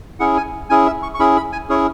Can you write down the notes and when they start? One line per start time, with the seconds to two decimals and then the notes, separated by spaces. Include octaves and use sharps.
0.20 C#4 E4 G#4 F#5
0.37 G#5
0.70 C#4 E4 G#4 G#5
0.86 E5
1.03 C#6
1.14 C#6
1.19 C#4 E4 G#4 B5
1.37 B5
1.53 G#5
1.69 C#4 E4 G#4 C#5